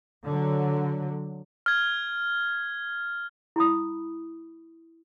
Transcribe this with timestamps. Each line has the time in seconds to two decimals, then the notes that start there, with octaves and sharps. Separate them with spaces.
0.25 D3 F#3
1.66 F6 G#6
3.56 E4 B5 D#6